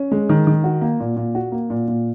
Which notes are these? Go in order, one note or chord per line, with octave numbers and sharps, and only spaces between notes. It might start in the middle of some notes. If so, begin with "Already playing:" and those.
Already playing: C#4
G#3
D#3
D#3
F#4
A#3
A#2
A#2
F#4
A#3
A#2
A#2